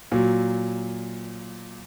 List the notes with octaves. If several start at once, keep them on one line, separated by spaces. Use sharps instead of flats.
A#2 F#3